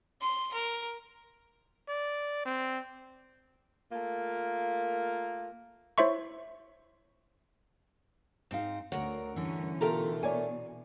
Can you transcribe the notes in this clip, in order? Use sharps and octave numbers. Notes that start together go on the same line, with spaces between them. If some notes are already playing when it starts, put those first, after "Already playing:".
C6
A#4
D5
C4
A3 A#3 F4 A#4
E4 C5 C#5 E5 C6 C#6
G#2 C4 D#4 F5
D2 A#4 C#5 F#5
G2 D3 E3 C#4
B2 A3 F4 G4 A4 A#4 A#5
C#5 D5 G#5